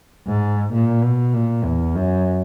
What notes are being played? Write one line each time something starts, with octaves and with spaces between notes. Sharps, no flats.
G#2
A#2
B2
A#2
E2
F#2